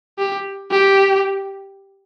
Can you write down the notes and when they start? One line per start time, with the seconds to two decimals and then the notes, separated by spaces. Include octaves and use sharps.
0.18 G4
0.71 G4